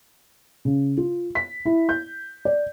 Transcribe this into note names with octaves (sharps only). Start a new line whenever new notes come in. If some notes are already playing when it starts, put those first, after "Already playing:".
C#3
F4
B6
E4
G6
D5